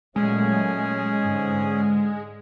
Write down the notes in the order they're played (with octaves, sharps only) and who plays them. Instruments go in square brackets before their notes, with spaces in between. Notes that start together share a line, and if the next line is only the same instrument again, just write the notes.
[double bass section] A#2 F#3 A3 [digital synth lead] G#3 [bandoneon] C#4 G#4
[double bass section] G#2 D3